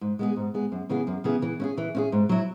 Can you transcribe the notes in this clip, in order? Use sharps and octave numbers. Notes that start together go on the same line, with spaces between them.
G#2
G#3 B3 G#4
G#2
G#3 B3 G#4
F#2
C#3 E3 B3 G#4
F#2
C#3 E3 B3 G#4
E3
C#4 E4 G#4
E3
C#4 E4 G#4
G#2
F#3 E4